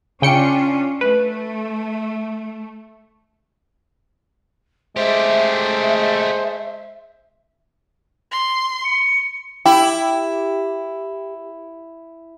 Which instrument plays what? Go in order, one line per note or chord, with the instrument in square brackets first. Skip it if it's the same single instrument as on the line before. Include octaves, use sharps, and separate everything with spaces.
[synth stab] C#3 G5 C#7 [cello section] C#4 D4 F4
[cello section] A3 [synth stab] B4
[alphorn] G#3 [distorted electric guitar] A3 G4 [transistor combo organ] C5 [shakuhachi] E5
[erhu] C6
[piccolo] C#7
[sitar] E4 [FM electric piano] G4